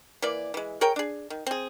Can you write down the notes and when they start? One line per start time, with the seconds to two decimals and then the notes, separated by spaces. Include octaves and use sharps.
0.22 E3 A#3 D5
0.54 E3 G#3
0.81 G#4 A#4 C#5 G5
0.96 D4 G#4
1.30 D#3
1.46 C4 G#4